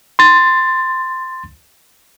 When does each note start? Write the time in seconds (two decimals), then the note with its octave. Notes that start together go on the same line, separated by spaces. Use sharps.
0.19 C6 A6